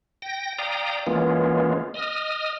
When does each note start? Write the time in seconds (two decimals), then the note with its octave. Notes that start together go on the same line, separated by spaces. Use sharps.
0.22 G5 A#6
0.59 D5 F5 G5 A#5 D#6
1.07 E3 G#3 A#3 B3 C#4 F4
1.94 D#5 D#6 F6